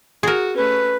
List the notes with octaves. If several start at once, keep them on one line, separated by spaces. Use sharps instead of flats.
F#4 G#4 A#4
A3 C#4 B4